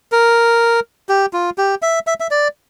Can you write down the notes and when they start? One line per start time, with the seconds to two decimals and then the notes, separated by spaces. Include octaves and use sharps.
0.12 A#4
1.09 G4
1.33 F4
1.58 G4
1.82 E5
2.07 E5
2.20 E5
2.31 D5